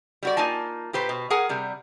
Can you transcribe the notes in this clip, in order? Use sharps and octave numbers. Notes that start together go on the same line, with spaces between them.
G3 F#4 D5
A#3 D#4 F4 G#5 A5
A#2 G4 B4 C5
B2
G#4 A#4 F#5 G#5
C3 G3